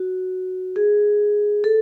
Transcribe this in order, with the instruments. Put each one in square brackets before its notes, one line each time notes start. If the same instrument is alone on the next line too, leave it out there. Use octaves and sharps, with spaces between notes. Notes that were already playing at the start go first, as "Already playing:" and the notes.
Already playing: [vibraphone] F#4
G#4
A4